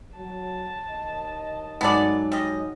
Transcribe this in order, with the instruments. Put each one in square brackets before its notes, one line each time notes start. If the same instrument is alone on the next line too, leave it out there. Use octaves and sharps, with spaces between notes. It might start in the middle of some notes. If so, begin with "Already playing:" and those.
[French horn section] F#3 [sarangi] A5
[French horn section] D#2 D#5
[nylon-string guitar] G#2 F#3 G#5 [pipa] B3 A4 D5
[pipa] G3 D#5